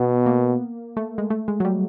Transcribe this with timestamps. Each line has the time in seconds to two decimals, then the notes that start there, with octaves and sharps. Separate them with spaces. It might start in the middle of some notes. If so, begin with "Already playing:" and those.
Already playing: B2 B3
0.26 A#3
0.97 A3
1.18 G#3
1.30 A3
1.48 G#3
1.60 F#3
1.65 G3